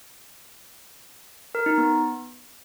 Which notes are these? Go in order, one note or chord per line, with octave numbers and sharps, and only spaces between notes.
A#4
D#4
B3